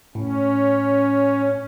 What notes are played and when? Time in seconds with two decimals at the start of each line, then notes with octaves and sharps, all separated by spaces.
0.15 A2 C#4